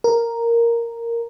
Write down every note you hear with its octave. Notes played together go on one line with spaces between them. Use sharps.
A#4